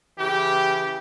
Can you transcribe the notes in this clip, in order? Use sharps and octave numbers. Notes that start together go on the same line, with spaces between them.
C#3 E3 G4